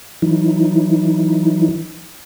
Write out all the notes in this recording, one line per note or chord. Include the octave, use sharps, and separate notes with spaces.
E3 F#3 D#4 E4